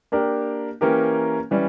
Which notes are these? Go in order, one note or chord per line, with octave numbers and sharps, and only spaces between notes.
A#3 D4 G4 A#4
E3 A#3 C#4 G4 A#4
E3 G3 C#4